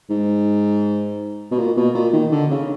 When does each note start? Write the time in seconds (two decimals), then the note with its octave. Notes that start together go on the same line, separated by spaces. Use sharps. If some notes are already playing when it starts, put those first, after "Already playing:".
0.10 G#2
1.51 B2
1.58 A#2
1.77 B2
1.94 A#2
2.13 D#3
2.32 D3
2.51 C#3